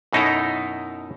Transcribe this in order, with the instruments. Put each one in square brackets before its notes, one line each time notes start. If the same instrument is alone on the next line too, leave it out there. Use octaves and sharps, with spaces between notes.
[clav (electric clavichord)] F#2 B2 D#4 E4 A4 A#5